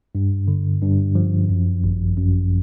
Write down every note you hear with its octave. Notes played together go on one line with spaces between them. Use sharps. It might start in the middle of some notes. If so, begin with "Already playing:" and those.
G2
D3
G2
F3
F#2
G#1
F#2